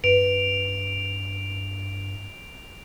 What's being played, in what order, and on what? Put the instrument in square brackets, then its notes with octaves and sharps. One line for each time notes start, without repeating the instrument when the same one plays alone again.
[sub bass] G2 [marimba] B4 [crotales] D7 F7